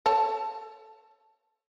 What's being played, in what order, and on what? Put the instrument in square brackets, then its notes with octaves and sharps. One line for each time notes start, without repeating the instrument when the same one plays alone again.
[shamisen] A4 C#5 A5